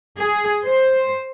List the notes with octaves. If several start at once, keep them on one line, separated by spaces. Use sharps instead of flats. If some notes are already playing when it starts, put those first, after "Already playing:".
G#4
C5